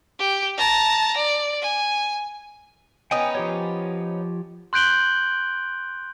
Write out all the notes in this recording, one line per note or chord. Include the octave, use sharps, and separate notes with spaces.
G4
A5 A#5
D5
G#5
B3 C#4 D#4 G5 G#5 D#6
F3 G4 C#5
C6 F#6 G6 D7 F#7 G7